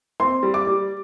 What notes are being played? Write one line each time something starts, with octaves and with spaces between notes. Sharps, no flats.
C4 C6
G3
D6
G3